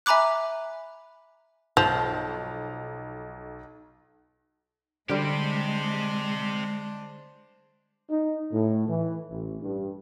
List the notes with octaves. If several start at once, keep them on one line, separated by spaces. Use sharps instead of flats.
E5 G#5 A#5 B5 D6 F#6
B1 F3
D3 G3 G#3 C4 D4 G4 C5
D#4
A2
E3
A1
G2